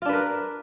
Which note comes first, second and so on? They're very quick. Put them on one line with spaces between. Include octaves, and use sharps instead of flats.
F4 D4 B4 A#4